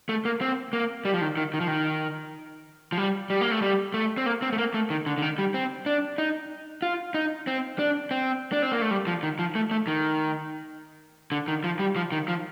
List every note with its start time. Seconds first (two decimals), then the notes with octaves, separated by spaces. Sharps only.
0.09 A3
0.25 A#3
0.41 C4
0.73 A#3
1.05 G3
1.14 F3
1.21 D#3
1.37 D#3
1.54 D#3
1.61 F3
1.68 D#3
2.92 F3
2.97 G3
3.30 G3
3.41 A#3
3.51 A3
3.62 G3
3.94 A3
4.18 C4
4.26 A#3
4.42 C4
4.52 A3
4.58 A#3
4.74 A3
4.90 D#3
5.06 D3
5.18 D3
5.22 D#3
5.38 G3
5.54 C4
5.86 D4
6.18 D#4
6.82 F4
7.14 D#4
7.47 C4
7.79 D4
8.11 C4
8.53 D4
8.62 C4
8.72 A#3
8.81 A3
8.91 G3
9.07 F3
9.23 D#3
9.39 F3
9.55 A3
9.71 A3
9.87 D#3
11.32 D3
11.48 D#3
11.64 F3
11.79 G3
11.96 F3
12.12 D#3
12.28 F3